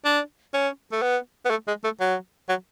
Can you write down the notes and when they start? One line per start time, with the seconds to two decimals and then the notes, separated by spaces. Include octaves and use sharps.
0.05 D4
0.54 C#4
0.92 A3
1.02 B3
1.45 B3
1.50 A3
1.68 G#3
1.84 A3
2.00 F#3
2.49 F#3